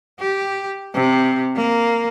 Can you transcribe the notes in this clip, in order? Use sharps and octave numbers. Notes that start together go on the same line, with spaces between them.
G4
C3
A#3